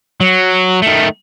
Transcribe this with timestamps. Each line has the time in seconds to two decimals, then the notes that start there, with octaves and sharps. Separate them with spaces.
0.21 F#3
0.82 D#3 A3